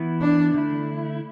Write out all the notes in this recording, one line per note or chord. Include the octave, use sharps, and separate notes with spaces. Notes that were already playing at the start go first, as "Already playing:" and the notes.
Already playing: E3 B3 E4
D4
D3 A3 E4